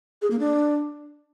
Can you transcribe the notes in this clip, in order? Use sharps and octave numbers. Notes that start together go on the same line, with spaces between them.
G#4
A#3
D4